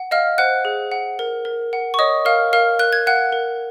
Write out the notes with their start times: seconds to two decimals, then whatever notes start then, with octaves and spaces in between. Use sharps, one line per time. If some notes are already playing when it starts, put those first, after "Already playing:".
Already playing: F#5
0.11 D#5 F5 F6
0.38 C5 F#5 F#6
0.65 G#4
0.92 F#5
1.19 A#4
1.45 A#4
1.73 F#5
1.94 C#6
1.99 C#5 D#5 D#6
2.25 A#4 F5 F6
2.53 A#4 F5 F6
2.79 A#4 F#6
2.93 G#6
3.07 F5 F#5 F#6
3.32 A#4